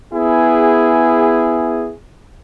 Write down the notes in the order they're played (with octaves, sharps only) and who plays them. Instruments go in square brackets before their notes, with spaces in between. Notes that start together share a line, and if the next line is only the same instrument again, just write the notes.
[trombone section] B3 E4 G#4